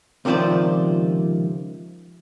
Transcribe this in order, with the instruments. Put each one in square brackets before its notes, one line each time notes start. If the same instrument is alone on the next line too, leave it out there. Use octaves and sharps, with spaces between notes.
[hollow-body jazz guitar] C#2 C3 D#3 F3 C5 D5